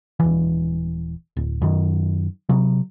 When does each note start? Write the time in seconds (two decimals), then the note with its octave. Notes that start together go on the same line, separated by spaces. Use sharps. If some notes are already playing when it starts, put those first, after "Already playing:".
0.20 D#1 E3
1.37 D1
1.61 F#2 D#3
2.49 C3 F#3